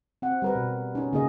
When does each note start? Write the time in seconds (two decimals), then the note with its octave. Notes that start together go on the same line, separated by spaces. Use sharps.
0.22 C4 F#5
0.42 G3 A#4 B4
0.55 B2
0.95 C#4 D#4
1.13 C#3 A#3 G#4 D#5